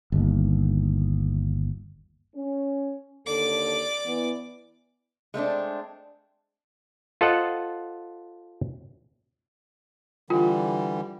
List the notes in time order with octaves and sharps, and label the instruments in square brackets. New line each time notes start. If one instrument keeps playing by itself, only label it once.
[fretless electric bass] G1 D#2
[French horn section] C#4
[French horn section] D#2 D3 A4 [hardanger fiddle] D5 D6
[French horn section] E3 B3
[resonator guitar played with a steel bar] G#3 A3 C4 D4
[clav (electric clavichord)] F4 A4 C5 D#5 F#5
[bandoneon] D3 E3 G3 [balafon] F4